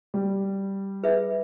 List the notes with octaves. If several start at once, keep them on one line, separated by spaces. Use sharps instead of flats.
G3
G#4 B4 E5